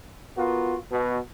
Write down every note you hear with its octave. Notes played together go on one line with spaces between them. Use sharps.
B3 F4 F#4 A#4
B2